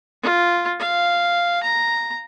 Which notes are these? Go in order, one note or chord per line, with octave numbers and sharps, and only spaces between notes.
F4
F5
A#5